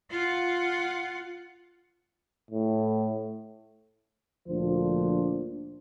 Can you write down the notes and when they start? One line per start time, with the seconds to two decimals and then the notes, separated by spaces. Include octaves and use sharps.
0.11 F4 F#5
2.51 A2
4.47 D2 A#2 F3 D4 C5